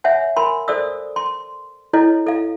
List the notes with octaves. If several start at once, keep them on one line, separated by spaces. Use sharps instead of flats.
C#5 E5 F#5 G#5
A#4 G#5 B5 C6
A4 C5 D5 D#6 E6
C6
E4 A4 C#5 D#5
A4 F5